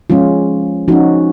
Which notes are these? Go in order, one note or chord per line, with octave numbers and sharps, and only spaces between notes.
F3 G#3 C#4 F4
F3 A#3 C#4 D#4 F#4